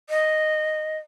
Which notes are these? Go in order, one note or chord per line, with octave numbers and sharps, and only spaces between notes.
D#5